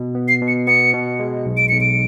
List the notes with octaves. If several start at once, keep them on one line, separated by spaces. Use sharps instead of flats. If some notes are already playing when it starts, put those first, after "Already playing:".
Already playing: B2
B3
C7
B2
C#7
B3 C#7
B2
G#3
B1
D7
B1 C#7
D7